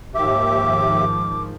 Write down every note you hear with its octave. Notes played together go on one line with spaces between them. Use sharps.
D#2 G#2 D#3 F3 G4 E5 D6